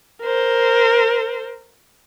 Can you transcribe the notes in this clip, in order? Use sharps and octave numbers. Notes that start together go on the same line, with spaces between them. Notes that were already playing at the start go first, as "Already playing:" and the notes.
A#4 C5